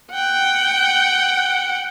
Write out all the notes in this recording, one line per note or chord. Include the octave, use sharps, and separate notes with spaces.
F#5 G5